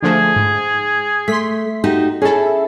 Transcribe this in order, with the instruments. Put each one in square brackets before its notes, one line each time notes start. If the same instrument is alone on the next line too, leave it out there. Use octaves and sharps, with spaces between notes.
[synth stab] D3 F3 A3 [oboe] G#4
[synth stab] G#2
[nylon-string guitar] A3 [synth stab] C6 B6
[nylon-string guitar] D#4 F#4 G4
[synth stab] C#4 A4 [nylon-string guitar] E4 G#4